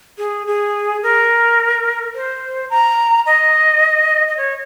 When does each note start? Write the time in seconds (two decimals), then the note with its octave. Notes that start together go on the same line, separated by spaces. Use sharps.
0.18 G#4
0.47 G#4
1.03 A#4
2.15 C5
2.70 A#5
3.26 D#5
4.28 D#5
4.37 C#5